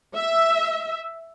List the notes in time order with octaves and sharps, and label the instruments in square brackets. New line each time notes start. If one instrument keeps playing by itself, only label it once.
[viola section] E5